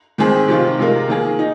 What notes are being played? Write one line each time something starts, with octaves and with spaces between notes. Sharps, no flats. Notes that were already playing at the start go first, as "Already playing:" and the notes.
G#2 D#3 C4 G#4
C3 D#3 C4 F4
C3 G#3 F4 A#4
D#3 A#3 G#4
D#4